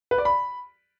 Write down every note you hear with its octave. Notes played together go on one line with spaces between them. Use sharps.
B4
D5
B5